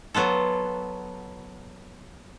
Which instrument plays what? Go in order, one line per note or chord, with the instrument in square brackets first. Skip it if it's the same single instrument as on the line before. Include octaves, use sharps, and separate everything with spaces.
[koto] F#3 B3 F4 A4